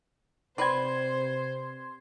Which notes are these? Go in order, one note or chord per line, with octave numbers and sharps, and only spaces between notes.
C3 C4 B4 C5 D5 C6 G#6